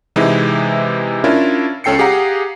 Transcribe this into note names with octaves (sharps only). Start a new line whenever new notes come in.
C3 E3 G#3 D#4 E4
C#4 D4 E4 F4 A#4
C#2 C#4 A4 G5 C7 C#7
G4 G#4 F5 F#5 A#5